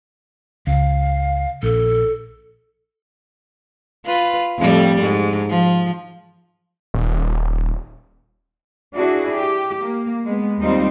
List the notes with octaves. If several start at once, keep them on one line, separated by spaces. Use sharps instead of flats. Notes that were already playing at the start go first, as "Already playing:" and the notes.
C#2 F5
A#1 A4
F4 B4
F2 A2 G3
G#2
F3
D#1
D4 E4 F#4 G#4
G4
A#3
G#3 B3
D#2 G3 C4 D#4 F4 C5